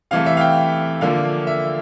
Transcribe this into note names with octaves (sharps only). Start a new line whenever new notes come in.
C3 E3 A3 F5
E5
F5
G5
D3 F3 A#3 F5
E5